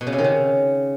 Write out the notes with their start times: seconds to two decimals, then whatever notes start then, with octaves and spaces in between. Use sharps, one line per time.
0.01 B2
0.07 C#3
0.13 C3
0.18 D#3
0.24 C#3